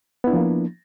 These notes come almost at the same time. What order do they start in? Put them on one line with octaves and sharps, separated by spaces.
B3 E4 D4 F3 A#3